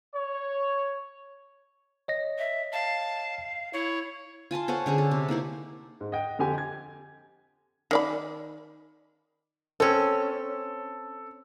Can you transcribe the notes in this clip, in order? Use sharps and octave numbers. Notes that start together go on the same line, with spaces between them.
C#5
C#5 D#5 A#6
E5
F5 A5
E4 C#5
F4 G#5 A5 C6
A4 C5 C#5 F#5
D3 C#4 G#4
A4
C3
A#3 D#4 E4 C5
G#2
D#5 F#5 G5
F2 D3 G4 G#5
G#6
D#3 D5 B5
C4 C#4 A4